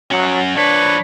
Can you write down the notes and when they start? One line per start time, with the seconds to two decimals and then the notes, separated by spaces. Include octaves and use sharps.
0.11 F#3 C#4 F#5
0.56 F3 D4 B4 C#5